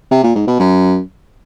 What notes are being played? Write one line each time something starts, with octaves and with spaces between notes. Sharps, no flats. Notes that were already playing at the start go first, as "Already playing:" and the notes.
C3
A#2
G#2
B2
F#2